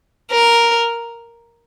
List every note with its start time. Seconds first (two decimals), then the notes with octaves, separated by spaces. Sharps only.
0.31 A#4